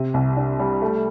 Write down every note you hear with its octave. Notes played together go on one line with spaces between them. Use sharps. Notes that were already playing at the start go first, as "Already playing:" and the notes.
Already playing: C3
C2
D4
G3
A3